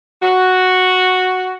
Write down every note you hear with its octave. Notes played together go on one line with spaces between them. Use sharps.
F#4